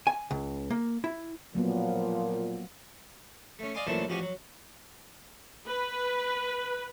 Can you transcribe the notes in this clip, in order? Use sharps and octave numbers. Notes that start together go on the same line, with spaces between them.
G#5
C#2
A#3
E4
A#2 F3 F#3 A#3 B3
A3 C#4
D5 D#5 F5 G#5 C6 D6
F#2 A#2 E3 A3 C5 A5
A1 F3 F#4 G4 G#5
F#3
B4